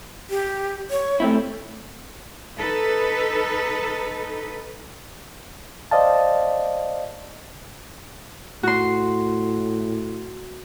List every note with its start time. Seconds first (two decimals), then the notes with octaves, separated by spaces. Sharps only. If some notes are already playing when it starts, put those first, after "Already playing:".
0.30 G4
0.90 C#5
1.20 A3 C4 E4
2.58 D#4 A4 B4
5.91 C5 D5 D#5 F5 A5
8.63 A2 F#4 C6